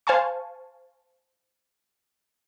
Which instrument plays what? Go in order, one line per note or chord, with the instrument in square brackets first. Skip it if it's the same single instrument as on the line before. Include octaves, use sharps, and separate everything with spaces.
[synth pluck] C5 F5 G#5 A5 C#6